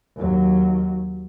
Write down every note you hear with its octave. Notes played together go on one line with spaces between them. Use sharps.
D#2 F#3